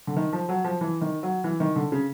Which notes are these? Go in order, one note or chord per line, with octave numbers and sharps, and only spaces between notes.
D3
D#3
F3
F#3
F3
E3
D#3
F#3
E3
D#3
D3
C#3